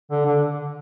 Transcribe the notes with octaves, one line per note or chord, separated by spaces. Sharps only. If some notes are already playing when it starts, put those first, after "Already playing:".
D3
D3